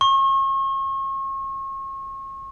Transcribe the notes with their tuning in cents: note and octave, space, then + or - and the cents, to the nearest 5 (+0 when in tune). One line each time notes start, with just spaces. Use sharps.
C#6 -40